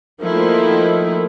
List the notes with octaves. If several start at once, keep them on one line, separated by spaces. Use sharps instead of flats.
D#3 F3 A3 A#3 D#4 E4